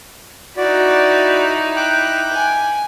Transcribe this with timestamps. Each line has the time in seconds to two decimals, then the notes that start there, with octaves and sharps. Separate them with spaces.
0.57 D#4 E4 F#4 D5
1.76 G5 D6 F#6
2.33 G#5